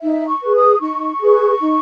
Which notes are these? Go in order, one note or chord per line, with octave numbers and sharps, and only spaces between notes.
D#4 E5
C#6
G#4 B4
D#6
D#4 C#6
G#4 B4
D#4